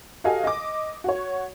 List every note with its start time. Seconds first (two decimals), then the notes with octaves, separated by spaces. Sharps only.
0.24 F#4 G4 A4 D#5 F5 G#5
0.44 D#5 D6
1.04 F#4 C#5